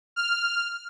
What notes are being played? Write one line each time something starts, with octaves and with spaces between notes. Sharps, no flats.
F6